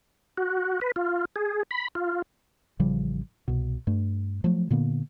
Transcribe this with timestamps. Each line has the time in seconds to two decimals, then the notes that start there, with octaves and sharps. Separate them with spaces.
0.38 F#4
0.81 B4
0.96 F4
1.36 G#4
1.71 B5
1.95 F4
2.79 A1 C#3 F3 G3
3.48 C2 B2
3.87 G2 A3
4.44 F3 F#3 A3
4.71 A#2 D3 A#3 B3